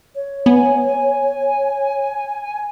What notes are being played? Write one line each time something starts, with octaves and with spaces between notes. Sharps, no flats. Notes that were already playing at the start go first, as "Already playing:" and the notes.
C#5
B3 G#5